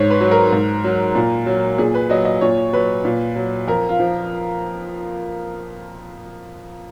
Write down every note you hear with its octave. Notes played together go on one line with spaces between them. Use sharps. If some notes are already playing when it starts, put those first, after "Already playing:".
Already playing: G#2 C#5
B4
F#3
A#4
G#2
F#3
A#2
F#3
A#2 G#4
B4
F#3 D#5
D#5
A#2 C#5
F#3 B4
A#2
F#3
F2 A#4
F4
F3